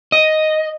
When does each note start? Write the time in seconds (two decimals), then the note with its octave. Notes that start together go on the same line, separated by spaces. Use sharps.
0.12 D#5